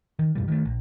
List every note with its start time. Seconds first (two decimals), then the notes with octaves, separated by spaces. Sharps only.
0.19 D#3
0.35 F#2 B2 G3
0.48 D#3 G3 A3
0.65 A#1